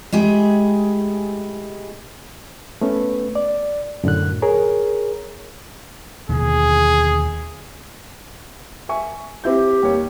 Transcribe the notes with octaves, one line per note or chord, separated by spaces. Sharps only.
G#3 A3 E4 G4 G#4
A3 B3 C#4 B4
D5
F#2 A2 D3 F#6
G#4 A#4 C#5
D#2 B2 D3 G#4
E5 G#5 C#6
C4 E4 G4 G6
D#2 C#5